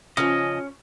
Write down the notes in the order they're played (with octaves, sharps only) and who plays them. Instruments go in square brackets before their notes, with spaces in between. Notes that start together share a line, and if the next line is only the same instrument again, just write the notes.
[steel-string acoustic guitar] C#3 F3 C5 [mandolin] C#4 [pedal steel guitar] D#5